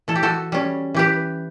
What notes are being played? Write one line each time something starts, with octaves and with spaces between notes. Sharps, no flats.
E3 A4
G4
F#4 A4
G3 C#4
E3 G4 B4